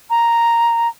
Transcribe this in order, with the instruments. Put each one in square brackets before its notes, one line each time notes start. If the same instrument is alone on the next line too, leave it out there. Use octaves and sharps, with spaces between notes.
[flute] A#5